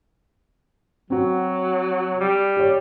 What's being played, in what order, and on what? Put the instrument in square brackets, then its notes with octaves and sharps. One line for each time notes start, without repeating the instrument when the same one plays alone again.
[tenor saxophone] F#3 [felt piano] C4 F#4
[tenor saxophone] G3
[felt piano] G4 C#5